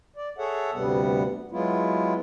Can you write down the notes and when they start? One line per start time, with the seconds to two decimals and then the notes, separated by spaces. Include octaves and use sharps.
0.16 D5
0.38 G#4 A4 C#5 E5 F#5
0.74 D2 G2 C3 G3 B3 F#5
1.51 F#3 G#3 B3 E4 F4